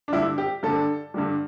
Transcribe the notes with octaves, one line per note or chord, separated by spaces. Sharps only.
D4
G2 D3 G3 E4
G4
G2 D3 G3 A4
G2 D3 G3